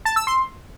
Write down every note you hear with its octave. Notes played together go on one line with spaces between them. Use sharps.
A5
E6
C6